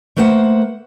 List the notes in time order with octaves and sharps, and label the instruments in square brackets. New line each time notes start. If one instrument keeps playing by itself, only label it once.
[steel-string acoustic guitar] A3 A#3 B4 C5 F#5